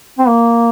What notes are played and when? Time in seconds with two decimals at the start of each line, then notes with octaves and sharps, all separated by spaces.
0.19 C4
0.27 A#3